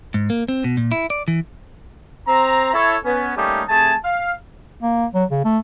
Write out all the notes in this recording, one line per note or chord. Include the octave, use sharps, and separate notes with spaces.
G#2
A#3
C4
B2
A#2
E4
D5
E3
C4 A#5
E4 A4 C#5
B3 C#4
G3 A3 A#3 C#4 D#4 G4
C3 A3 G#4 G#5 A5
F5
A#3
F#3
C#3
A3